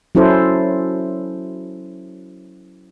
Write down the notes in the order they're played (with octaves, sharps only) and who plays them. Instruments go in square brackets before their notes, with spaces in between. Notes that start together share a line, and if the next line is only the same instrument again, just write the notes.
[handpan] F#3 C#4 E4 A4 C5